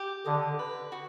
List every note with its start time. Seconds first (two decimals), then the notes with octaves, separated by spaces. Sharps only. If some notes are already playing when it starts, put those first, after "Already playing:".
Already playing: G4
0.26 D3 D#5
0.59 B4
0.92 F#4